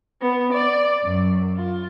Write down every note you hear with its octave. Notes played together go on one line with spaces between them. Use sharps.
B3
D5
F#2
F4